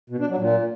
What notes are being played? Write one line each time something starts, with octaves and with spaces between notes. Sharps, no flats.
B2
D4
F#3
A#2